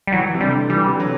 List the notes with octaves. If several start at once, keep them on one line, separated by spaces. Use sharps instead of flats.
G3
E3 F#3
E3
C3
D3 G3
D3
E3 G3
D3
F#3